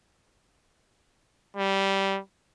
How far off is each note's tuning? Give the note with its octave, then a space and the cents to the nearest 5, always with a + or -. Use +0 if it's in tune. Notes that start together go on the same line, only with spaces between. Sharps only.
G3 -10